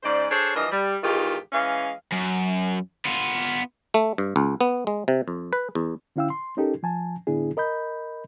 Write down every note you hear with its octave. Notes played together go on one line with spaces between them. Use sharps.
G#2 C#3 C5 D5
D4 G#4 A4 C5 C#5
E3 F3 G3 D4 A#4 D#5
G3
E2 G#2 D#3 G#3 F4 G4
E3 G#3 C#4 F5
F#2
B3 F4
A3
G2
C#2
B3
G#3
C3
F2
B4
E2
D3 C#4 E4 F5 G5 E6
C6
C#4 D#4 G4 A4 A#4
F3 G#5 A5
A2 D3 B3 D4 E4 G#4
A#4 D#5 B5 G6